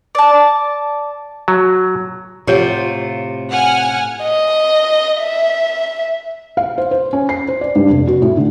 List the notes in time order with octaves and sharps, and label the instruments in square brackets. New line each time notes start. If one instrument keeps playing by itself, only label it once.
[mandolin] D5 A5
[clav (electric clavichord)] F#3
[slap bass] A2 [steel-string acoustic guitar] C3 F4 [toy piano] G4 C#5 F#5
[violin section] F#5 G#5 F6
[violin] D#5
E5
[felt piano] F5
C5
C5
C#4
C7
C5
D5
G2
F1
F#4
A2
D3